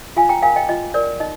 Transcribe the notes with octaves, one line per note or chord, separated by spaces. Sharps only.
F4 F5 G#5
G5 A#5
A#4 F5 G#5
D#5 G5
F4 D#5
A#4 D5
D#4 D#5